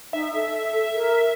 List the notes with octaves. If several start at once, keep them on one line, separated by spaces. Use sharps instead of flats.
D#4 E5
A4
A#4